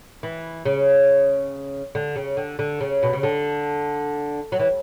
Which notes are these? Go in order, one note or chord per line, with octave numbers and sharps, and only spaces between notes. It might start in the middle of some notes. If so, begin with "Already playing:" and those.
E3
C#3
D3
C#3
D3
D3
C#3
B2
C#3
D3
F#3
E3